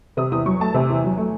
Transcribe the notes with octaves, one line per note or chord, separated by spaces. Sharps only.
C3 D#6
E2 D#6
F#3 C#6
A3 A5
C3 G#5
E2
F#3
A3